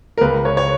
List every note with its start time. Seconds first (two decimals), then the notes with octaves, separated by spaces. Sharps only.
0.18 A#4
0.21 C#2 B4
0.45 C#5
0.57 C#5